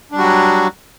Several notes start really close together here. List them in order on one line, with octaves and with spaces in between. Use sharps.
D4 G3 F#4 F#3